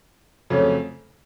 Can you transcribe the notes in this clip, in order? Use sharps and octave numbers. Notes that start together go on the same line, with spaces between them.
F2 C#3 F#3 A3 C#4